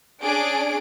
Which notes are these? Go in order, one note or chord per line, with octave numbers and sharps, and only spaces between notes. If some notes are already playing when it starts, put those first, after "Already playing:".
C#4 D4 G#4 D7